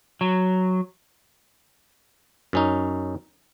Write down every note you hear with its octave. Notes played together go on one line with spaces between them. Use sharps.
F#3
F#2 C#4 D#4